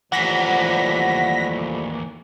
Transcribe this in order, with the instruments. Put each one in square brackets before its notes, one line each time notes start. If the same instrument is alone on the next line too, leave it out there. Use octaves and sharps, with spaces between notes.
[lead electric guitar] D#2 E3 [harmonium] F3 G3 A3 [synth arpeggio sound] F#5 A#6 B6